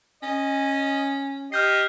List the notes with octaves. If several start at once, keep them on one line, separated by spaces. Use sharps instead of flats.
C#4 D#5
G4 D#5 F6 G6 C7